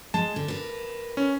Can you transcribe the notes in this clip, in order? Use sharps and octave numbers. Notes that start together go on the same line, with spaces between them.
G#3 A5
D3
A#4 B4
C#4